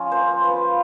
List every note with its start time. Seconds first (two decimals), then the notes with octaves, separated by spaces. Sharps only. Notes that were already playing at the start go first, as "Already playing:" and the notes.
Already playing: F3 C#4 F4
0.11 A#3 C5
0.43 F4 B4